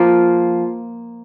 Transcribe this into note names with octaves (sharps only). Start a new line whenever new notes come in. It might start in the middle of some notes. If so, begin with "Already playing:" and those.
Already playing: F3 A#3 F4